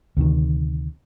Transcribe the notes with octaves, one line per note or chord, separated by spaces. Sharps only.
D2 C3 D#3